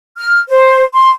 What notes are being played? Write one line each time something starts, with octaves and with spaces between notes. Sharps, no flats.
F6
C5
C6